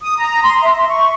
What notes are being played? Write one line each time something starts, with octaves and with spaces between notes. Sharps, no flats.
D#6
A#5
C6
E5
C#6